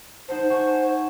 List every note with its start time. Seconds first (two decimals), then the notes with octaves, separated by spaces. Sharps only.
0.28 D#4 C5 F#5 A5
0.50 F#5 G#5 C#6